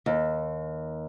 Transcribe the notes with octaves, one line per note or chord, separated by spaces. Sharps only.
D#2